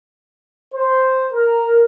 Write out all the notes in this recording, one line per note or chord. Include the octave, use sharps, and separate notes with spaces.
C5
A#4